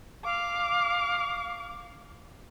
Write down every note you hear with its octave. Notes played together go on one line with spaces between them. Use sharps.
F5 D6